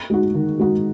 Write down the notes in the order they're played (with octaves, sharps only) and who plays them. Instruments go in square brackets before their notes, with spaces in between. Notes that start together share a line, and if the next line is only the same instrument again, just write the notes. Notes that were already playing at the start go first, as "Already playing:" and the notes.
[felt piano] G#3 D#4 F#4
D#3
G#3 D#4 F#4